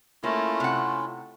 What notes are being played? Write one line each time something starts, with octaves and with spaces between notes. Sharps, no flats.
A3 A#3 C#4 E4 F4
C3 F#5